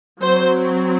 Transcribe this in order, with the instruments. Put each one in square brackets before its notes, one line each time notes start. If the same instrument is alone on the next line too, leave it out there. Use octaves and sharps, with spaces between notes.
[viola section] F#3 C4 C5